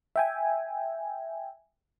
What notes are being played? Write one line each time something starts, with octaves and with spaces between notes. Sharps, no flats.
E5 G5 G#5